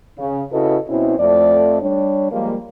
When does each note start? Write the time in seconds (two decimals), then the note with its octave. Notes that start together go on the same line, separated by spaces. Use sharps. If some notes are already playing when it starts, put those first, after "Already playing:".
0.18 C#3
0.52 C#3 E4 F#4 A4 B4 D#5
0.89 B2 C4 C#4 E4
1.19 F2 A3 D5
1.82 G3 D4 C#5
2.31 F3 G3 G#3 A#3